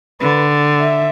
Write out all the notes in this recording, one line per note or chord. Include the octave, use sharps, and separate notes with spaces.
D3 B4
E5